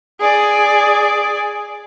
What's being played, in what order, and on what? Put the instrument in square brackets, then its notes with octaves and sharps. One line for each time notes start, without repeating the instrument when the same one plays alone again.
[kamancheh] G#4 D5